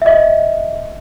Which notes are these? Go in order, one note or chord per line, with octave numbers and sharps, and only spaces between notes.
D#5 E5